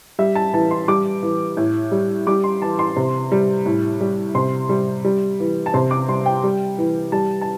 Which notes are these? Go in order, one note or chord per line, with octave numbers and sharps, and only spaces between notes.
G3 E5
A5
E3 A5
C6
G3 D6
E3
A2
G3
G3 D6
C6
E3 A5
C6
C3
G3
A2
G3
C3 C6
G3
G3
E3
A5
C3 C6
D6
G3 C6
G5
G3
E3
G3 A5
A5